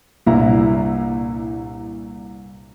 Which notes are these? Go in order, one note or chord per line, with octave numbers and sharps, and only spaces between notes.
C2 G2 A#2 E4 A#5